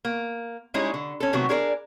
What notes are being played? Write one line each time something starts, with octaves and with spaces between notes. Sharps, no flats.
A#3
G3 G#3 C#4 D#4 E4 G#4
D3
C#4 A4
C3 D#3 F#3 A3 B3 F#4
D4 G#4 A#4 B4 D5